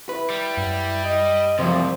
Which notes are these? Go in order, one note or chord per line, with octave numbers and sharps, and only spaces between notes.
E4 B4
G3
F#2
D#5
C2 C3 F3 F#3 C5